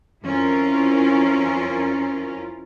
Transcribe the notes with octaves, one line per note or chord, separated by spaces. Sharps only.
F2 C#4 E4 F4 A#4